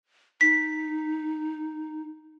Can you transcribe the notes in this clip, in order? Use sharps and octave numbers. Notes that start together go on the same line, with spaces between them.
D#4 B6